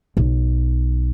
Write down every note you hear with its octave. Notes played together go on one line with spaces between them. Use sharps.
B1